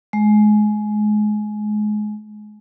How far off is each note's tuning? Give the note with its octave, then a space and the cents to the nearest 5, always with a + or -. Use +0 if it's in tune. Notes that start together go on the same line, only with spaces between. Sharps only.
G#3 +25